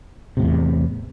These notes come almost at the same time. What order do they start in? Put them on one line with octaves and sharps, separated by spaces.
C3 A2 E2